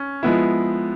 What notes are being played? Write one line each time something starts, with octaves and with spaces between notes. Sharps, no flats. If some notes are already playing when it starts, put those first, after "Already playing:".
Already playing: C#4
F3 G#3 B3 E4